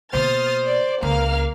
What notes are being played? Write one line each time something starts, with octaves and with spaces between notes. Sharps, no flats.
B2 A#3 C5 D#6 F6 A6
D5
C#2 A#3 F5 F6